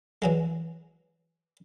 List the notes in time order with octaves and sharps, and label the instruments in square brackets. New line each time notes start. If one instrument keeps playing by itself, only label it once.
[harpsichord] E3 F#3 G#3